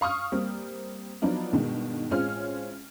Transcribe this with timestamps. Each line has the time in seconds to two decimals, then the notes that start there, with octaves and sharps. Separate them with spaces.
0.01 F5 C#6 D#6 F6
0.32 G3 A#3 C4
1.22 F3 F#3 B3 D4 D#4 F4
1.52 G2 B2 D#3 G#3
2.10 A1 G#3 C4 C#4 F4 F6